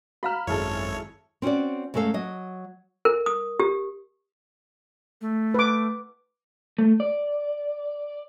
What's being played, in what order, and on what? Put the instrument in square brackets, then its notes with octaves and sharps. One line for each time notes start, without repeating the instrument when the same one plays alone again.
[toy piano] F#4 F5 A#5 [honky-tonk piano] B5 F6
[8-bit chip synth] G#1 C#5 [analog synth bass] F#2 [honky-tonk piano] E4 G#4 A4
[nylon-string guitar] C4 C#4 F4 F#4 D5
F#2 G#3 A3 B3 A4 F5
F#3 D#5
[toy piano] A#4
D#6
G4
[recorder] A3
[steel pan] B4 D6
[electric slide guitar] A3
D5